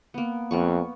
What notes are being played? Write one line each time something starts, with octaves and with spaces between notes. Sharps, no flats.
A#3 B3
F2 A#3 B3 C#6